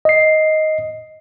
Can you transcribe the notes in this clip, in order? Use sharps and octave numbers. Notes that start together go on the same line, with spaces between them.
D#5 C7